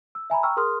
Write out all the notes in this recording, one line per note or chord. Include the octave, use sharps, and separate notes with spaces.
E6
E5 G#5 A#5 B5
G5 A#5 C#6 E6 F6
G#4 A#4 C6 D#6 F6